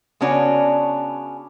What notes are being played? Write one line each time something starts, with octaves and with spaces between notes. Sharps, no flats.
C#3 B3 C#4 D4 F#4